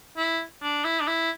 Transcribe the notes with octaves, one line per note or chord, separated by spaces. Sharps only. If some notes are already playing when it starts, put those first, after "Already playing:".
E4
D4
E4
D4
E4